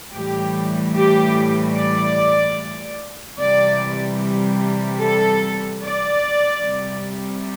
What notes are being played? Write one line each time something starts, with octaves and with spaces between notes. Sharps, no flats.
A2 E3 G3 G4
G4
D5
C3 E3 G3 D5
A4
D5
C3 G3